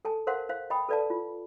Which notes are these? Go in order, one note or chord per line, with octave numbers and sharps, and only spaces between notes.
A4 G#5 A5
A#4 C5 F5 F#5 C6
C5 F5
D#5 G5 G#5 B5 D#6
A4 B4 D5 F5 A5
F4